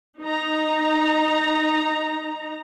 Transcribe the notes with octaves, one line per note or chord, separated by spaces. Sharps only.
D#4 A#5